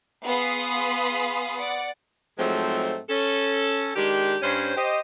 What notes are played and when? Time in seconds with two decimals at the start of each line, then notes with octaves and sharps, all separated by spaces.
0.24 B3 G#4 F5 B5 C6 D#6
1.58 D5 F#5
2.38 G#2 F3 F#3 G#3 A3 C4
3.10 C#4 A4
3.96 D#3 G#3 D4 G4
4.43 G2 C#4 C5
4.77 G4 C5 D#5